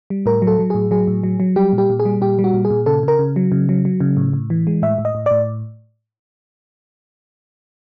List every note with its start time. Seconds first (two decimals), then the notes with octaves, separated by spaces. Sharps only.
0.10 G3
0.26 A2 A#4
0.42 F#3
0.47 A4
0.59 F#3
0.70 A2 G#4
0.91 F#3 G#4
1.07 A2
1.23 F#3
1.40 F#3
1.56 G3 G4
1.73 A#2
1.78 G4
1.90 A#2
2.00 G#4
2.05 G3
2.21 A#2 G4
2.39 G3
2.44 F#4
2.54 A#2
2.65 G#4
2.70 A#2
2.86 C#3 A4
3.03 C#3 A#4
3.19 C#3
3.36 F#3
3.52 C#3
3.69 F#3
3.85 F#3
4.00 C#3
4.17 A2
4.33 A2
4.50 E3
4.67 G#3
4.82 A2 E5
4.98 A2
5.05 D#5
5.15 A2
5.26 A2 D5